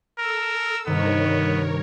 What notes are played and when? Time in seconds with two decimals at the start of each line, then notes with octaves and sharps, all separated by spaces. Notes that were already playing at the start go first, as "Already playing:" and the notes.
0.18 A4 A#4 E6
0.87 G2 C3 D#3 B3 A#4 C#5